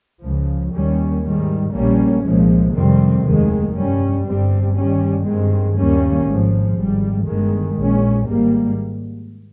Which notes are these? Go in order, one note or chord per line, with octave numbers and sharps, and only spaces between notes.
C#2 C#3 F3
D#2 D#3 G3 C#4
G#2 D#3 G3
A#1 A#2 G3 A#3 C#4
C2 A#2 F3 G#3
F2 C3 D#3 G3 C4
F1 D#2 D#3 G#3
G2 G3 C#4
G1 G2 G3 C4
G2 D#3 G3 C#4
G2 D#3 G#3 C4
D#2 D#3 G3 A#3 C#4
G#1 G#2 F3
G#1 G#2 G3
G1 G2 D#3 G#3
A#1 A#2 G#3 C#4
G#1 G#2 G3 A#3